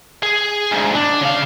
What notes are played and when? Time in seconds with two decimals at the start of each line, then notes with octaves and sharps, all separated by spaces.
0.23 G#4
0.71 D2 G#2
0.95 D4
1.21 C#3 F5